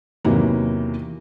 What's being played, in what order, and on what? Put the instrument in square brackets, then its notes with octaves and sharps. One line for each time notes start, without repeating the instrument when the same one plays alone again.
[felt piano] E2 C3 D#3 E3 F#3 A#3